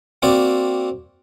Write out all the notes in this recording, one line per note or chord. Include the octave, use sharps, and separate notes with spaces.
A#3 C4 F#4 D5